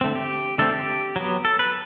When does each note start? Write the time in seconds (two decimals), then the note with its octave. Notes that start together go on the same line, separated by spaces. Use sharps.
0.01 D3 A3 C4
0.15 G4
0.58 D3 A3 C4 A4
0.73 G4
1.16 F#3 B3
1.45 A4
1.59 B4